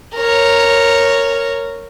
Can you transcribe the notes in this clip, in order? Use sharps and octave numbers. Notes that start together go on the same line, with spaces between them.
A#4 C#5